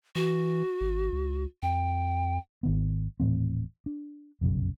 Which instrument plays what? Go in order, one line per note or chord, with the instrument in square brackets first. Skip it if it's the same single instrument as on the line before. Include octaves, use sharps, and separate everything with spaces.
[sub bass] E3 [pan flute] F#4
[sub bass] G#1
C#2
[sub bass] F2 [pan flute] G5
[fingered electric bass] G#1 D#3 B3
D#1 A2 E3 C4
D4
F1 B1 F#2 C#3